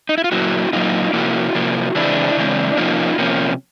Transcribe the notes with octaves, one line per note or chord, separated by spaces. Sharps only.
D#4
E4
F4
A#2 F#3 A#3 E4 F#4
A#2 F#3 A#3 D#4 F4
C3 F3 A#3 E4 F#4
C3 F3 A#3
C#3 E3 G#3 C4 D4 E4
C#3 E3 G#3 C4
C3 F3 A#3 C#4 D#4 F4
C3 F3 A#3 C#4